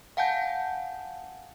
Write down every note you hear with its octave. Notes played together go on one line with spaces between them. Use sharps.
F5 F#5 G#5 A5 G6